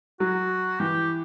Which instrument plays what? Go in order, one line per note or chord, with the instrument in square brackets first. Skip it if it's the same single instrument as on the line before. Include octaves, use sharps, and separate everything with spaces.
[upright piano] F#3 [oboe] F#4
[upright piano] E3 [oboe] G4